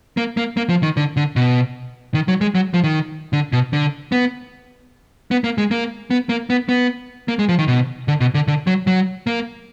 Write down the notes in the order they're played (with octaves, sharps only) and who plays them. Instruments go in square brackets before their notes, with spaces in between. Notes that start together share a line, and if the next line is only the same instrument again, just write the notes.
[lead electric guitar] A#3
A#3
A#3
F3
D#3
D3
D3
B2
D#3
F#3
G#3
F#3
F3
D#3
D3
B2
D3
B3
B3
A#3
G#3
A#3
B3
A#3
B3
B3
A#3
G#3
F3
D#3
B2
D3
B2
D3
D3
F#3
F#3
A#3